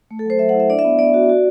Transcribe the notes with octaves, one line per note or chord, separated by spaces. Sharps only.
A3
A4
F#3 C5
F#3 E5
F#5
E4
E5
D4 D5
E5
B3
B3 D5
F#4
F#4